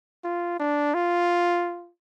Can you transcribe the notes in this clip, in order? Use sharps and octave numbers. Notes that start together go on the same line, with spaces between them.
F4
D4
F4